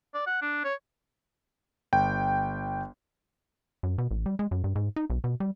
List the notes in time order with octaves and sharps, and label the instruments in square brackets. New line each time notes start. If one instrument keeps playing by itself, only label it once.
[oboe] D5
F#5
D4
C#5
[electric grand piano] G1 G5
[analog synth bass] F#2
B2
A1
G3
G#3
F#2
G2
G#2
D#4
B1
B2
G3